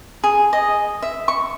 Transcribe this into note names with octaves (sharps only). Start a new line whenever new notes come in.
G#4
D#5
E5
C#6